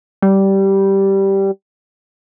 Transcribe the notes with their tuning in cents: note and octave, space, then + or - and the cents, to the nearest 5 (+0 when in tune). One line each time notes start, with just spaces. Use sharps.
G3 -10